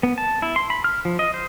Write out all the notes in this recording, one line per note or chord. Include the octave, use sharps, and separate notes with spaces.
B3
A5
E4
C6
B5
F6
F3
D#5
C5